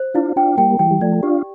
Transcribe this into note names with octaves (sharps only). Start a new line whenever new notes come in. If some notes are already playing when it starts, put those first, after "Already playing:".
Already playing: C5
D4 E4 F4
D4 F4 G5
G3 A#3 G5
E3 G3 G5
G3
F3 A3 D5
D4 F4 G4